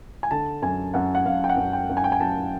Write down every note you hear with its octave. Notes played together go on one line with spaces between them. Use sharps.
G#5
D3 A5
F#2 G#5
F#2 F#5
F#5
F#2 F5
G5
F#5
F#2
G5
F#2
G#5
G5
G#5
F#2 A5